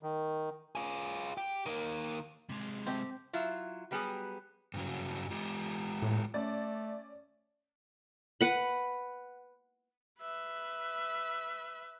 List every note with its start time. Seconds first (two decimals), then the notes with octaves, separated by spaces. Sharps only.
0.03 D#3
0.75 F4 G#4
1.38 G4
1.66 D#3 A#3
2.49 C3 G#3
2.86 A3 C4 G4 C5
3.33 F#3 E4 F4
3.91 F#3 G3 B3 G4 G#4
4.74 G2 C#3 F#3
5.30 G#3 F4 G4
6.02 A2
6.34 A3 C#4 D5 A6
8.41 B4 F#5 B5
10.20 B4 E5